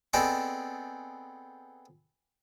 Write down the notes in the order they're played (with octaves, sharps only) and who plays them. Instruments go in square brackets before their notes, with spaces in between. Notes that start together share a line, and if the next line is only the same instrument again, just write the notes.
[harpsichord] B3 C4 G#4 A4 D5 D#5